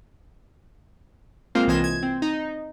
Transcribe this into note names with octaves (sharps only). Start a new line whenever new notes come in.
G#3 A#3 C4 F4 C5
C2 E3 F4 D#5 G#5 E7
G#6
C4
D#4